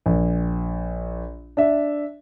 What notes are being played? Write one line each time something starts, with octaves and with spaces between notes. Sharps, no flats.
A#1
D4 E5